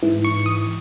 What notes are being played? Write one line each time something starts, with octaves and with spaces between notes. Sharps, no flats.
G#2 E3
C#6
D#6